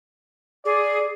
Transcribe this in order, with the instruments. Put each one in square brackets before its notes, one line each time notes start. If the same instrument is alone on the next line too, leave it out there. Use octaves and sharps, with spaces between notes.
[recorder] G#4 [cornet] D5